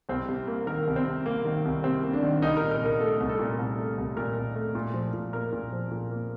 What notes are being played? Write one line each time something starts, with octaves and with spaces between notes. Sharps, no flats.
C2 C4
C3
A#3
D#3 A#4
C2
C4
C3
A#3
D#3
C2
C3 C4
A#3
D4
D#3
C2 D#4
A#4
A#2
A#4
C2 A#4
A3 A4
C2
A4
A#2
C2
A3
C2
A#2 A#4
C2
A3
A#2
F3
A#2
A#3 A#4
A#2
F3
A#2
A#3